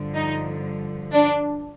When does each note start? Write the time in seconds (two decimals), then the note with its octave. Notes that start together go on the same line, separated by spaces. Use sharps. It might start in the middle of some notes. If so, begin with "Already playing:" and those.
Already playing: G2 D3 F3
0.15 D#4
1.12 D4